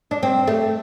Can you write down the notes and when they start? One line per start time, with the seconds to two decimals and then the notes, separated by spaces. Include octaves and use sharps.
0.11 D4
0.23 C4
0.48 A3